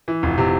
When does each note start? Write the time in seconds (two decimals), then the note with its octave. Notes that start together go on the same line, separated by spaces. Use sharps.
0.08 E3
0.23 F1
0.38 C3